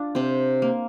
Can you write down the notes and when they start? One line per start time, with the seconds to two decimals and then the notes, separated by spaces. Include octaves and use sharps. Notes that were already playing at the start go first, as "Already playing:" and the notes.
Already playing: D4 F4
0.15 C3 C4
0.62 A#3